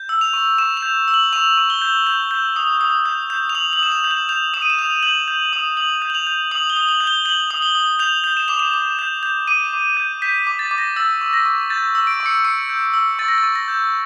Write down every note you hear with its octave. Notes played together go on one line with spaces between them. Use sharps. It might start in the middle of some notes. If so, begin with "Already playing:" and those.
Already playing: G6
E6
F7
C#6
C#6 E7
F7
G6
E6
F#7
C#6 F7
C#6
G7
G6
G6
G6
D#6
D#6
G6
G6
F7
D#6 F#7
F#7
D#6 E7
F7
G6
F#7
G6 F7
D#6 E7
D#7
E7
D#6 F7
G6 F#7
G6
D#6
D#6 F#7
G6
F#7
F7
G6
D#6 F#7
G7
D#6
F#7
G6
G7
G6 F#7
D#6
G7
D#6
G6 F7
G6
E7
D6 F7
E7
D6
G6
G6
D6 D#7
D6
G6
G6 B6
D6
A6
D6
A#6
E6 A6
C#6
A#6
C#6
G6 A6
E6
D7
C#6
C#7
C#6 C#7
G6
E6
C#6 A6
A#6
A6
C#6
A#6
G6